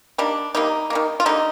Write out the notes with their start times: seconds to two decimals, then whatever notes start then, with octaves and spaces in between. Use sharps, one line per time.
0.18 D#3 G3 A#3 D4
0.55 C3 D#3 G3 A#3 D#4
0.90 D#3 G3 A#3
1.20 F4
1.26 D3 G3 A#3 D#4